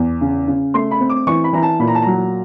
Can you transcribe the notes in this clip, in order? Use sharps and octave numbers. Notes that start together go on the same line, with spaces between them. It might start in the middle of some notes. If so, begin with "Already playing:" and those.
Already playing: E2
C#3
C#3
A3 C6
B5
C4
D6
E3 C#6
B5
E3 A#5
A5
A#2 B5
A#5
A5
F#3 A#5